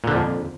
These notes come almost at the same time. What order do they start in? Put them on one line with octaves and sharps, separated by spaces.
A#2 D3 F3 F2